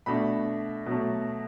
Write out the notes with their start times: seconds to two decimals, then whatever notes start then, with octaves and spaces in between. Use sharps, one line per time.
0.06 B2 A3 D4 B5
0.86 B2 F#3 A3